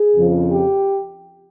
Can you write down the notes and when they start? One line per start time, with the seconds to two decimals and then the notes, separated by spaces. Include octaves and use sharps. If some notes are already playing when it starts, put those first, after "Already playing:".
Already playing: G#4
0.15 F2 C#3 F3
0.52 G4